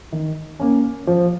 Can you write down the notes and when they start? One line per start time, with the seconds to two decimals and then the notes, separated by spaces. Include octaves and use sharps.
0.12 D#3
0.60 A#3 C#4
1.07 F3